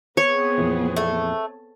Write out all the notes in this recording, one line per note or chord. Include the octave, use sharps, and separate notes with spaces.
B3 C4 G#4 C#5
F2 A#2 E3
A3